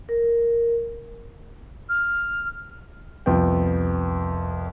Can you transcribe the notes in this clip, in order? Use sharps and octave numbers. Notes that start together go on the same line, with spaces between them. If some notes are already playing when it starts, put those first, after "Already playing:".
A#4
F6
C2 F2 B3 G5